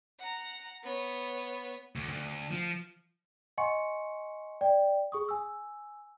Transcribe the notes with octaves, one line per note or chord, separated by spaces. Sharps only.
F#5 A#5
B3 C#5
D2
D2
F3
D#5 F#5 G#5 C6 C#6 C#7
D5 G5
G#4 C#6 D#6
G#5 E6